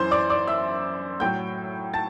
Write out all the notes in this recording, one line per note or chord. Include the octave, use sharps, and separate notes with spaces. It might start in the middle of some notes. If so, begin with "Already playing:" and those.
Already playing: F#2 E3 C5 C6
D5 D6
D5 D6
E5 E6
A2 F#3 G5 G6
A5 A6